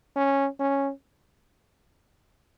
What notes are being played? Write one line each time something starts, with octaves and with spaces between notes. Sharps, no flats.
C#4
C#4